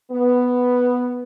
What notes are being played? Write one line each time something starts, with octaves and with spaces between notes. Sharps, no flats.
B3